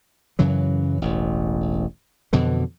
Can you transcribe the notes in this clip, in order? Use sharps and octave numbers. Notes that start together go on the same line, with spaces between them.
F#2 C#3 E3 F#3
E1 A1
F2 B2 D3 E3